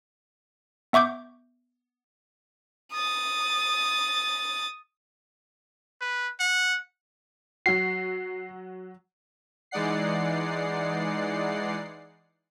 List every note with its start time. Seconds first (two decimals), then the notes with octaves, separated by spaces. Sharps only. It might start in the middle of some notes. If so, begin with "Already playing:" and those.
0.93 B3 E5 C#6 D6 G6
2.93 D#6 A6
6.01 B4
6.40 F#5
7.66 F#3 F#4 C7
9.71 E3 G#3 D#4 D5 F#5 C7